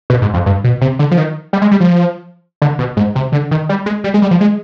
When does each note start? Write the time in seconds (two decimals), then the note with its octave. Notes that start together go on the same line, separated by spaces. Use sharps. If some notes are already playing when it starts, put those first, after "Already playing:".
0.10 B2
0.22 G#2
0.34 F2
0.46 G2
0.64 B2
0.81 C3
0.99 D3
1.11 F3
1.18 D#3
1.53 G3
1.62 G#3
1.71 G3
1.80 F3
2.62 D3
2.79 B2
2.97 G#2
3.15 C3
3.32 D3
3.51 D#3
3.69 G3
3.86 G#3
4.04 G3
4.14 G#3
4.22 G3
4.31 F3
4.41 G#3